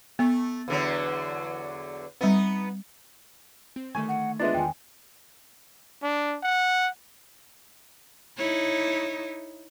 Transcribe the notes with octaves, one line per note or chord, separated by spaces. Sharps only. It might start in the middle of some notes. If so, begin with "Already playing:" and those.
A3 B3
E2 D3 F#3
G3 B3 C4 D#4
C4
D3 D#3 A3 G#5 C#6
F#5
G#3 B3 D4 F4 E5 A6
E2 D#3 G5 G#5
D4
F#5
D#4 E4 C#5